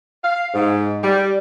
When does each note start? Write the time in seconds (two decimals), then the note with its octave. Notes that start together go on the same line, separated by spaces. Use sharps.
0.23 F5
0.54 G#2
1.03 G3